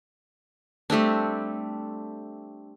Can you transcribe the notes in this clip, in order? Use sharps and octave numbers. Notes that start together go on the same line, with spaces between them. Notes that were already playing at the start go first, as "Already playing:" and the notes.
G3 A3 C4 D4